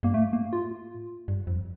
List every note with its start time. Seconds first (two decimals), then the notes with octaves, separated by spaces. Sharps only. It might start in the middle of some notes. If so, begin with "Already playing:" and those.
0.03 G2 A#3
0.14 A2 A3
0.33 A#3
0.53 F4
1.28 G2
1.47 F2